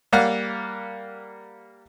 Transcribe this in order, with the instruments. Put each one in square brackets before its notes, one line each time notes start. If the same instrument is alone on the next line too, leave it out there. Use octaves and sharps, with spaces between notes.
[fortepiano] G3 A#3 F5 F#5